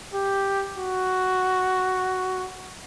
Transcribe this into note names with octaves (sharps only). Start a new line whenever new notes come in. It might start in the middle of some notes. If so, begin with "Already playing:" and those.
G4
F#4